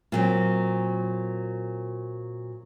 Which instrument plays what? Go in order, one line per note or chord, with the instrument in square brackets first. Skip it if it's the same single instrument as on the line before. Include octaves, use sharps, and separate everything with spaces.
[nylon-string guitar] A#2 F#3 C4